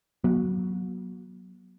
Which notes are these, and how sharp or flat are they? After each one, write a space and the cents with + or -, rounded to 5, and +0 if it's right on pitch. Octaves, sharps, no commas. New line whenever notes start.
F#3 +0 B3 -45